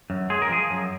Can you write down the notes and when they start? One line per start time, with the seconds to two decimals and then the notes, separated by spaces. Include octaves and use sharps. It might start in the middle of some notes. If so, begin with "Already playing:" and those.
0.10 F#2
0.30 G#3 G#4
0.42 A#4
0.49 F3 G#4
0.70 F#2